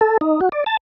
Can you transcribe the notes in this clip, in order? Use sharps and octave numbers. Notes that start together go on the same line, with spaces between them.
A4
D#4
F#4
D5
A5